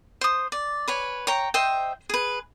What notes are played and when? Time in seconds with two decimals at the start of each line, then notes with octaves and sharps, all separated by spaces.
0.21 C5 D#6
0.52 D5
0.88 B4 C#5 G#5
1.27 C#5 G5 A#5
1.54 C5 D#5 E5 G5
2.09 G#4 B4